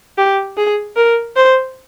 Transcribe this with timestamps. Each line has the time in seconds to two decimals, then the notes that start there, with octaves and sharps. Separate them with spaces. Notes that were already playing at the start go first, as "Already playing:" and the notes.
0.18 G4
0.58 G#4
0.97 A#4
1.36 C5